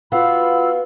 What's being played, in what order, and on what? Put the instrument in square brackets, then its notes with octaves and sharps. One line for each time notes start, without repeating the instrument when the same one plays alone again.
[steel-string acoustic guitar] B3 F#4 F5 [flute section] F4 B5 E6